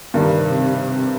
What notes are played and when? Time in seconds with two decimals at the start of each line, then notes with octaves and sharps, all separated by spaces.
0.14 G2 C3 D#3 G3